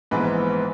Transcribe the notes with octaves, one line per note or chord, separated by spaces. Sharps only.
A#1 G#2 E3 B3 B4